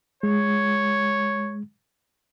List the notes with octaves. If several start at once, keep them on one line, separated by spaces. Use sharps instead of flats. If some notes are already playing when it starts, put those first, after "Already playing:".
G#3 C#5